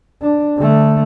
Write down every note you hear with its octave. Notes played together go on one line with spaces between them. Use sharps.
D4
D3 A3